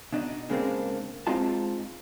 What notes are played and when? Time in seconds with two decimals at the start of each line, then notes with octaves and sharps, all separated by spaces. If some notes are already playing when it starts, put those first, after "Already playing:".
0.13 B2 D4 D#4
0.50 C#3 G#3 A#3 C4 D4
1.27 G#3 C4 D#4 F4 A5